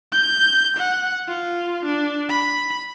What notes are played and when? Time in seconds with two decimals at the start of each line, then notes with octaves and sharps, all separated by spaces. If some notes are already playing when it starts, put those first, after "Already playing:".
0.12 G6
0.77 F#5
1.28 F4
1.85 D4
2.29 B5